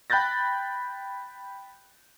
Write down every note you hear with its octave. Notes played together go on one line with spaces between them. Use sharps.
G5 B5 F#6 G6 A6 A#6